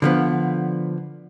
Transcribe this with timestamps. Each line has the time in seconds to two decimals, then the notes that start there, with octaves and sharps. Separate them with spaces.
0.02 D3 F3 B3